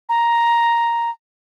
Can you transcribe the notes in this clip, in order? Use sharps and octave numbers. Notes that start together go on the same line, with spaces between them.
A#5